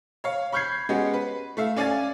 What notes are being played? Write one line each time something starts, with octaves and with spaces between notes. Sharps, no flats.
C#5 F5
B5 C#6 F6 G6 G#6 C7
G#3 B3 C#4 F#4 G4
B4
A3 E5 F5
C#4 D5 F5 G#5 A6